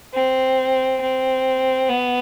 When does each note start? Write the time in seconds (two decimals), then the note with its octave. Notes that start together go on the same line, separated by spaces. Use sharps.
0.14 C4
1.01 C4
1.89 B3